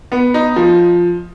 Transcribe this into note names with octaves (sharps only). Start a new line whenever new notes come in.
B3
D#4
F3